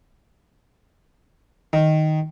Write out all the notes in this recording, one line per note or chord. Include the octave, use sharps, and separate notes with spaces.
D#3